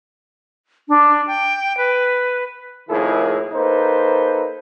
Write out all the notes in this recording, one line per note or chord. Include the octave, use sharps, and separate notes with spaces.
D4
G5
B4
F2 A2 D#3 A#3 E4 G#4
A#3 D#4 A4 B4 C5